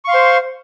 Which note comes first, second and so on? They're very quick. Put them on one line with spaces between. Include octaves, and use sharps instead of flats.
C#6 F5 C6 C5